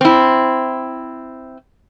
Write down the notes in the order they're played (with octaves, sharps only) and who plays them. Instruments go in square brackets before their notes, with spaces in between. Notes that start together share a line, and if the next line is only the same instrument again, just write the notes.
[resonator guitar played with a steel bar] C4 E4